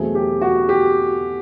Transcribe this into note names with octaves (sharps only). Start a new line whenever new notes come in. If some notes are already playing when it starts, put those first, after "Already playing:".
Already playing: E2 B2 F#3 A3 C4 G#4
G4
F#4
G4